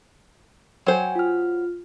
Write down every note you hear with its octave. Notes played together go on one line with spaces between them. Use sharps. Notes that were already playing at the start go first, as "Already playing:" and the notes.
F#3 C5 G5 G#5
F4 F6